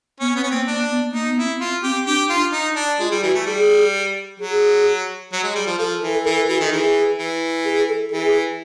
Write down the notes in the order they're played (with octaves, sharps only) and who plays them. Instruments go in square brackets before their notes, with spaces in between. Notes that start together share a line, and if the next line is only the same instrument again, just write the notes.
[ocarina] B3 [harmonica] C#4
[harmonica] B3 [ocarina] C4
[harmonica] C#4
[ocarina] A#3 [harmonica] C4
[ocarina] A#3 [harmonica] D4
[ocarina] B3
[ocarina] A#3 [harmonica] D#4
[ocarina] B3
[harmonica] E4
[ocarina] C4
[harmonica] F4
[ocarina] C4 [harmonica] G4
[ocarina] D4 [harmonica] G4
[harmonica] F4
D#4
D4
[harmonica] G#3 [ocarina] F4
[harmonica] G3
[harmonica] E3 [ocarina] F#4
[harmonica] A3
[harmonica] G3 [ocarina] G#4
[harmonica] F#3 [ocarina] G#4
[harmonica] F#3
G#3
G3
F3
[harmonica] F3 [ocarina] A4
[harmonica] E3
[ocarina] A4
[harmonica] E3 [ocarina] A#4
[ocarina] A4
[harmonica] E3 [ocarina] F#4
[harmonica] D#3 [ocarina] A4
[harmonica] E3 [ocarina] G#4
[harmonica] E3
[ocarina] G#4
A4
[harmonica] E3 [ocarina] G#4